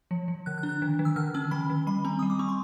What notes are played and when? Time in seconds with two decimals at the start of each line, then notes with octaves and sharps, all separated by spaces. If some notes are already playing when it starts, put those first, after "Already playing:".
0.11 F3
0.28 F3
0.46 D3 F#6
0.58 F#6
0.63 D4
0.69 F#6
0.82 D#3
0.99 D#3
1.05 E6
1.16 D3 F6
1.34 C#4 E6
1.51 D#3 B5
1.70 D#3
1.87 G3 B5
2.05 C4 A#5
2.19 G3 D#6
2.30 D6
2.39 C4 C#6
2.49 C6